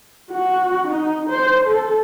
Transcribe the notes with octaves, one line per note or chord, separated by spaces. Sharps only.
F#4
D#4
C5
A4